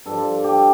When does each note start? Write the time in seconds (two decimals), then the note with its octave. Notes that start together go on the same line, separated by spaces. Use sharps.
0.06 G2 F3 A4
0.44 G4